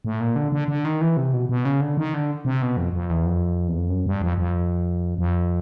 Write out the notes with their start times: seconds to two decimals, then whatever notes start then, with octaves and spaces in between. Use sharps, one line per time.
0.05 A2
0.20 A#2
0.36 D3
0.52 D3
0.68 D3
0.85 D#3
1.01 E3
1.17 C3
1.34 B2
1.49 B2
1.65 C#3
1.81 D3
1.97 D#3
2.14 D3
2.45 C3
2.62 B2
2.77 F2
2.93 F2
3.10 E2
3.26 F2
3.68 E2
3.78 F2
3.90 F#2
4.06 G2
4.22 F2
4.38 F2
5.18 F2